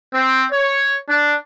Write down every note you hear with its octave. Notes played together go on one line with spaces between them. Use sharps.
C4
C#5
D4